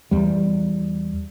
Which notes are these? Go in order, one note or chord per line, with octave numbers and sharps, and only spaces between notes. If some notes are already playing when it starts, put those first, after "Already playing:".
E2 G3